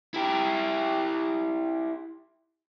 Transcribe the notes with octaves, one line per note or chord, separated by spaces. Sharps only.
E4 G4